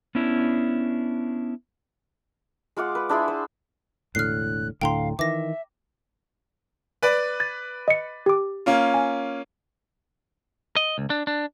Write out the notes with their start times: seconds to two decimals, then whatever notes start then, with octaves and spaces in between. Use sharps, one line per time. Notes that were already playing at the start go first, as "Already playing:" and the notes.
0.15 B3 C#4 D4 E4
2.77 G#3 F4 F#5 D6
2.95 B4
3.09 D4 E4 G#4 C6
3.28 C5
4.15 E1 A2 D3 F6 F#6 C7
4.81 D1 A2 D3 F5 G5 A#5 C6
5.19 D#3 E3 E5 D6 A#6
7.02 B4 D5
7.40 G#6 A6
7.88 D#5 C#7
8.26 G4 D6
8.66 A#3 C#4 F4
8.94 G#5
10.76 D#5
10.98 C#2
11.10 D4
11.27 D4